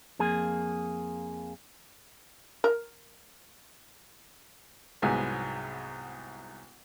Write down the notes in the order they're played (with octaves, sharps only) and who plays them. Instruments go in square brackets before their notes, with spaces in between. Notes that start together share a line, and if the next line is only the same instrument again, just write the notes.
[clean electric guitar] F2 A#3 G#4
[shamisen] A#4
[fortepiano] C2 G#2 F#3 B3 G#4 G#5